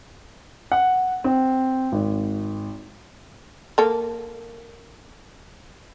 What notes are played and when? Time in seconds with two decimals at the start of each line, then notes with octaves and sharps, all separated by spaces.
0.72 F#5
1.24 C4
1.92 G#1
3.78 A#3 A4